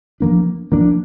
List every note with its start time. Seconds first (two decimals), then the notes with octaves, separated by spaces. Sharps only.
0.20 F3 A#3 D4
0.72 F3 A#3 D4